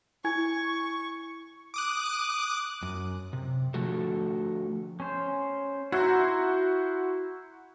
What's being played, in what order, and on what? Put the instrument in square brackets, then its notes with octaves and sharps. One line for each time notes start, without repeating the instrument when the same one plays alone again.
[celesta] E4 G#5 G#6 [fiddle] C#6
[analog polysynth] D6 D#6 F#6
[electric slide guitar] F#2
C3
D3 F3 A3 F#4 A4
[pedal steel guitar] C#4 C5
[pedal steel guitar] E4 C5 A#5 [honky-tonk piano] F#4